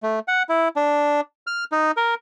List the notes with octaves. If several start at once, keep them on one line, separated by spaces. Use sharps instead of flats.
A3
F#5
E4
D4
F6
D#4
A#4